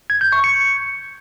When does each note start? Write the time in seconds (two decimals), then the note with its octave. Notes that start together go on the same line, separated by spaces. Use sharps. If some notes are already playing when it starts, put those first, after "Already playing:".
0.10 G#6
0.21 G6
0.32 C#6
0.44 C#7